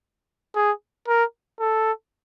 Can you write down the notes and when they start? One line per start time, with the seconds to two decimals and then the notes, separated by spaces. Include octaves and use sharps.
0.55 G#4
1.08 A#4
1.60 A4